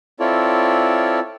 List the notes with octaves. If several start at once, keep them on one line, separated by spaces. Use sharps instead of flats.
C4 E4 F4 A4 C#5 D5